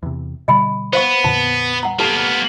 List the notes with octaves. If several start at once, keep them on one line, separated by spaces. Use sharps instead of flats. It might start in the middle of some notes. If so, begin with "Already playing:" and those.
E2 C3
B2 D3 G3 D#5 G#5 B5
B3 C5 F5 C#6
F2 A#2 D3 A5
F#5 A#5
A#3 B3 G4 A4 A5